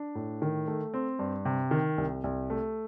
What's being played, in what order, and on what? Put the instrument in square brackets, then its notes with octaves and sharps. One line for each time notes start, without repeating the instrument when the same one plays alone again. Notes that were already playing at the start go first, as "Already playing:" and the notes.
Already playing: [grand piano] D4
A2
D#3
A3
C4
G2
C3
D#3
C2
C2
A3